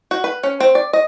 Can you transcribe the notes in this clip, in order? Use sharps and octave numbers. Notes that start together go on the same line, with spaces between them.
F#4
B4
C#4
C4
D5
D#5